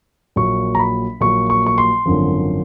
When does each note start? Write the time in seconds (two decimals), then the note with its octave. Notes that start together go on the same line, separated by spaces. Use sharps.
0.36 A#1 A#2 F#3 C#6
0.75 A#5
0.79 B5
1.20 A#1 A#2 F#3 C#6
1.50 C#6
1.66 C#6
1.78 C6
2.06 G#1 F#2 D3 F3